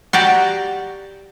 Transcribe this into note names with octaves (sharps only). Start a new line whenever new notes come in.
F#4 G4 D5 A#5